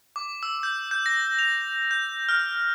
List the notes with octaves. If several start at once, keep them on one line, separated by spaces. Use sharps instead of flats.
D6
E6
G6
G6
A#6
F7
G6
F6